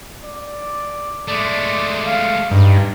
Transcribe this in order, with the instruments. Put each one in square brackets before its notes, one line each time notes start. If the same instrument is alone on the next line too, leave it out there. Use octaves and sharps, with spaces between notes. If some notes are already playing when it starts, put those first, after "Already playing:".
[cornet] D5
[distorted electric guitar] G#3 A3 [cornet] D5
[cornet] F5
[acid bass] G2 [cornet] D#4